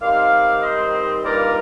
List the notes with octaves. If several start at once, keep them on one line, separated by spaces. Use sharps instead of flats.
D#3 G3 C4 D#4 D5 F5
C5 D#5
G2 D#3 G3 A#3 F4 A#4 D5